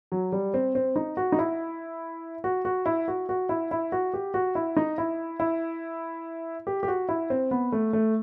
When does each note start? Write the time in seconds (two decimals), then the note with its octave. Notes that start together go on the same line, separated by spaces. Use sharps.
0.12 F#3
0.32 G3
0.54 C4
0.75 C4
0.96 D#4
1.17 F#4
1.32 D#4
1.39 E4
2.44 F#4
2.65 F#4
2.86 E4
3.08 F#4
3.29 F#4
3.49 E4
3.71 E4
3.92 F#4
4.14 G4
4.34 F#4
4.55 E4
4.77 D#4
4.98 E4
5.40 E4
6.67 G4
6.83 G4
6.88 F#4
7.09 E4
7.30 C4
7.51 B3
7.72 A3
7.93 A3